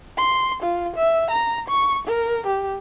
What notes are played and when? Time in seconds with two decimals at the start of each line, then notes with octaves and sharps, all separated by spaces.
0.17 C6
0.62 F4
0.96 E5
1.30 A#5
1.68 C#6
2.07 A#4
2.47 G4